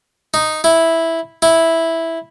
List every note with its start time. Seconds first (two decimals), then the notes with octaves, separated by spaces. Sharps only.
0.34 D#4
0.64 E4
1.42 E4